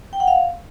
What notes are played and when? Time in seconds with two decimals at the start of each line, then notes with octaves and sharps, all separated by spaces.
0.13 G5
0.20 F#5
0.28 F5